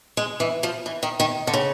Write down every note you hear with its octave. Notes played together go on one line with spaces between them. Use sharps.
G#3
E3
F3
E3
D#3
D#3
D3
C#3